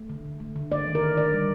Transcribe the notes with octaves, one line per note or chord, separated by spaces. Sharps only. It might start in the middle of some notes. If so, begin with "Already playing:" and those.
Already playing: A3
D3
D3
A3
D3
A#3 D5
D#3
A#4
D#3
D#3 D5
G3